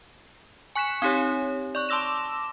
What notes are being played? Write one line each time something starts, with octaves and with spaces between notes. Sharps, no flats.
G#5 C#6 F#6 B6 C#7 E7
C4 D#4 G4 C#5
D5 C#6 F#6
A5 C6 D6 E6 A#6 E7